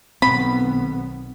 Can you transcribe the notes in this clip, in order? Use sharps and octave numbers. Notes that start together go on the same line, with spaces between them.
B1 D#3 B3 C4 B5